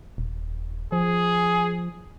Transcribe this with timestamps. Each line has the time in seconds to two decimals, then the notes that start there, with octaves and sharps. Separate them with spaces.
0.18 D#1
0.92 F3 G#4